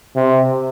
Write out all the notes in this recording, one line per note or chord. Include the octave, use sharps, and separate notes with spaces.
C3